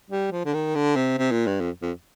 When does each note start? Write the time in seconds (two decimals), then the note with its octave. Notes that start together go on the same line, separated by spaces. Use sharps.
0.10 G3
0.31 F3
0.45 D3
0.54 D#3
0.75 D3
0.96 C3
1.18 C3
1.31 A#2
1.46 G2
1.60 F2
1.82 F2